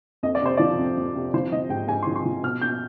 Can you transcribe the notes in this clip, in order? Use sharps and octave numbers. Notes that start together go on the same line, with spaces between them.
F2 D#5
D5
C3 C5
F3 D5
F2
F2
C3
F3 C5
F3 D#5
G#2 G5
G#2 G#5
C6
F3
C6
F3
B2 F6
B2 G6